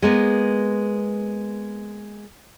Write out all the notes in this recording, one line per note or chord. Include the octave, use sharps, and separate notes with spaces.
G#3 A#3 B3